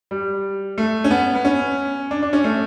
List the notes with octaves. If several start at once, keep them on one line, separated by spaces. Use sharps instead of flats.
G3
A3
C#4
B3
B3
C#4
D4
D4
C#4
A3